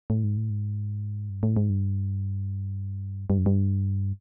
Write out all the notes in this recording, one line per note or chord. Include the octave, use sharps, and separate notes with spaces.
A2
G#2
A2
G#2
G2
A2
G#2
G2
G2
F#2
G2